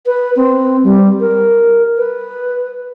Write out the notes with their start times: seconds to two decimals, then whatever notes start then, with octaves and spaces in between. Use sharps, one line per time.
0.06 B4
0.36 C4
0.84 G3
1.20 A#4
1.98 B4